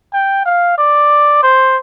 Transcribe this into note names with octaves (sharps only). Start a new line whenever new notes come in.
G5
F5
D5
C5